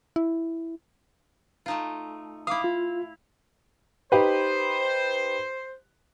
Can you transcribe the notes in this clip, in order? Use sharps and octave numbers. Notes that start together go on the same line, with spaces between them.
E4
A3 D#4 F4
E4 F5 D6 D#6
F4
D#4 G4 B4 C5